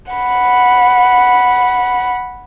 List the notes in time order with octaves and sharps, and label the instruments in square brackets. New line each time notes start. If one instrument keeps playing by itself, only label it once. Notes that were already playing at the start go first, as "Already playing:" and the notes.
[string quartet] F#5 B5